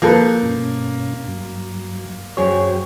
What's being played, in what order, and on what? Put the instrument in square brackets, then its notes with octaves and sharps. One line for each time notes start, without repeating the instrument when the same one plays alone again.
[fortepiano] F3 A4 B4 [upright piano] A#3 [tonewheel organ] G6
[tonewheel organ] G2 B2 C#4
G2 F#3
[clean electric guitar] F#2 G#4 C#5 [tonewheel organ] F#4 C5 G5